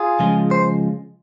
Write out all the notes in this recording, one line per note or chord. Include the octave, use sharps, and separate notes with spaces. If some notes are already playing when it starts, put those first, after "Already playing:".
Already playing: F4 G#4
C#3 F3 G#3
C5